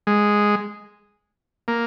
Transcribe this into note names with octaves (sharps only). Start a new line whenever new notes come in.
G#3
A#3